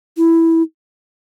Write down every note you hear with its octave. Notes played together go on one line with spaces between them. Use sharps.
E4